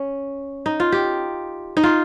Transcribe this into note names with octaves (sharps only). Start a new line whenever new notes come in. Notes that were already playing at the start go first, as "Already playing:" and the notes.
Already playing: C#4
D#4
F4
G4
D#4
F4